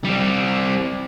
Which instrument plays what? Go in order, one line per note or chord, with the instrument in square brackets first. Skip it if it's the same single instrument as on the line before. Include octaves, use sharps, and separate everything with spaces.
[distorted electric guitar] G3 C4